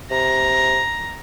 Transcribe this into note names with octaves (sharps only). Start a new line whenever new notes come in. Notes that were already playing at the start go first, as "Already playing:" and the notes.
C3 A#5